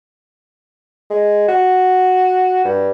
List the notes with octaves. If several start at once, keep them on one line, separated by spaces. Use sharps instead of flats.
G#3
F#4
G2